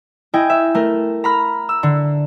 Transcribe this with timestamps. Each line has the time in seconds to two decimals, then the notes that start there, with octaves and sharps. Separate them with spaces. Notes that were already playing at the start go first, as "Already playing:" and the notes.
0.34 E4 D#5 G5 G#5
0.50 E5
0.74 A3 A#4
1.24 A#5 B5 F6
1.69 E6
1.83 D3